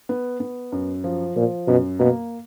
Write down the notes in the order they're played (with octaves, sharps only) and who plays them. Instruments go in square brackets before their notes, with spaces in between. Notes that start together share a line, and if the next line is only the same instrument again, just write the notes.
[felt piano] B3
B3
F#2
F3
[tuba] A#2 [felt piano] F3
[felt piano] F#2 [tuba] B2
[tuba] B2 [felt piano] A#3